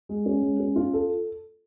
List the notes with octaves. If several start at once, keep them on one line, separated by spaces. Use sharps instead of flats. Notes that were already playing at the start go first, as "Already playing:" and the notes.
G#3
C#4
G#3
C#4
F4
A4